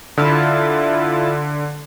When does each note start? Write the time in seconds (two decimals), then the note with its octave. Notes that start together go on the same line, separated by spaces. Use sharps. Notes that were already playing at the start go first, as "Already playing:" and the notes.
0.17 D3 E4 F4 A5